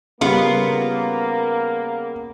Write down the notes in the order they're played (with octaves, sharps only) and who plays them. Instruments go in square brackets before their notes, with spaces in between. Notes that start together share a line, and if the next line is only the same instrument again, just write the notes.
[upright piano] C#3 G3 [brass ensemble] A#3 [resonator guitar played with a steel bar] B3 F4